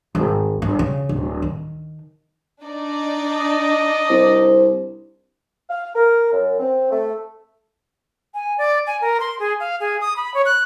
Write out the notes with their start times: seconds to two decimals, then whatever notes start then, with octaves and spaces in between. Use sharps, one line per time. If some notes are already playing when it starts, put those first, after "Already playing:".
0.15 G#1
0.62 G1
0.79 C#3
1.09 D1
1.42 D#3
2.63 D4 D#4 D5
3.35 D#5
4.10 C2 C5
5.70 F5
5.96 A#4
6.32 F#2
6.60 C4
6.91 A3
8.34 G#5
8.58 D5
8.87 G#5
9.01 A#4
9.20 C6
9.39 G#4
9.60 F5
9.80 G#4
10.01 D#6
10.16 B5
10.34 C#5
10.45 F#6